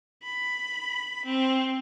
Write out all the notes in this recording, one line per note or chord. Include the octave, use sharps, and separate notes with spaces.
B5
C4